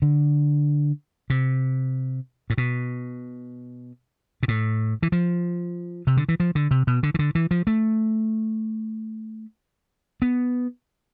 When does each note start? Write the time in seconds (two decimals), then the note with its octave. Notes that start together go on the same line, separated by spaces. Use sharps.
0.02 D3
1.30 C3
2.50 A2
2.58 B2
4.43 B2
4.48 A2
5.03 E3
5.12 F3
6.07 C3
6.17 D3
6.29 E3
6.40 F3
6.55 D3
6.71 C3
6.87 B2
7.03 D3
7.14 E3
7.19 D3
7.35 E3
7.51 F3
7.67 A3
10.22 B3